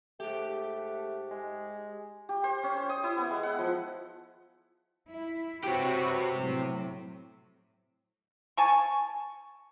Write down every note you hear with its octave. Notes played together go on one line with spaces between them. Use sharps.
G#2 A3 G4
G#3
G4
C5
C#4
C5
D#6
E4
B3
G#3
F#5
F3
E4
C4 F#4 G4 B4 C#5
A2 F#3
G#5 A5 C#6